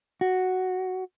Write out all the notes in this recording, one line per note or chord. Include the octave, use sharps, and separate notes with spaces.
F#4